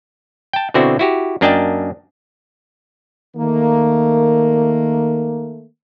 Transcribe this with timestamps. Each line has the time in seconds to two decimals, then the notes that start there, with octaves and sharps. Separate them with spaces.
0.53 G5 A5
0.74 B2 D3 C4 E4 F#4
0.99 E4 F#4 G4
1.41 F#2 A#3 D4 D#5 G5 A5
3.37 D#3 A3 A#3